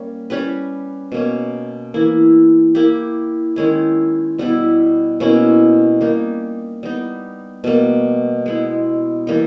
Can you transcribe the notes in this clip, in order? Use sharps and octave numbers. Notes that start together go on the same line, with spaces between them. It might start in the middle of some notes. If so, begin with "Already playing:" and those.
Already playing: G3 A#3 C#4
G3 C#4 G4 B4
B2 A#3 C#4
E3 A#3 E4
A#3 E4 G4
D#3 G#3 C#4 E4
B2 G3 B3 E4
B2 A#3 C#4 E4
G3 A#3 D#4
G3 B3 D#4
B2 G3 A#3
G#3 B3 E4
E3 G3 A#3 D#4